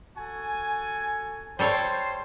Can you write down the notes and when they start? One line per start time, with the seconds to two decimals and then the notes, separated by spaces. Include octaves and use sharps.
0.17 F#4 A4 G#5
1.59 G3 A4 C5 C#5